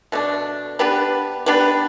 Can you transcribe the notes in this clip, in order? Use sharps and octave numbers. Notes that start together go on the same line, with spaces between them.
B2 A3 D4
B3 D4 G4 B4
B3 D4 G4 B4